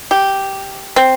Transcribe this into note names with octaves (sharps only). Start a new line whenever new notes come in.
G4
C4